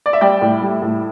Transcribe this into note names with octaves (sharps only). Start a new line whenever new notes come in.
D5
E5
G3 D5 G5
A2
G3
A2